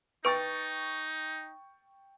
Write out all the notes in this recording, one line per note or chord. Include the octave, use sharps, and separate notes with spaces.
D#4 B4 G5 C#6 A6 D7